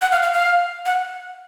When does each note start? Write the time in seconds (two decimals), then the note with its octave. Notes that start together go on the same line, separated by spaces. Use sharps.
0.02 F#5
0.12 F5
0.23 F5
0.33 F5
0.86 F#5